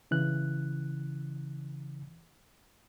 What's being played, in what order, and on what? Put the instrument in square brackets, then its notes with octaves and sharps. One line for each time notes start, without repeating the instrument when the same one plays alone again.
[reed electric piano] C#3 E3 F#6